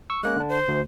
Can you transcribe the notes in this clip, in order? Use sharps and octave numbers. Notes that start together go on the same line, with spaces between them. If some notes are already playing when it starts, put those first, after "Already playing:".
C#6 E6
G#3 A#3 C#4 F#6
D3 D4
C5
D2